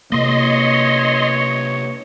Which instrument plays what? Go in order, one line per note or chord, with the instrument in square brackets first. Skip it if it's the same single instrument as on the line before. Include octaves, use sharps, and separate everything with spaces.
[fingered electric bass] C3 A#3 [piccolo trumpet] C#5 [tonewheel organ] D#5 C6